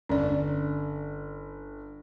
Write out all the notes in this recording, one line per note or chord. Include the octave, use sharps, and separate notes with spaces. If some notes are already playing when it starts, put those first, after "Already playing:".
G1 C#4 D5